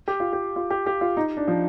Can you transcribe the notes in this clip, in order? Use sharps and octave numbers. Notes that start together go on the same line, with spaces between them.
G4
F4
G4
F4
G4
G4
F4
D#4
D4
F3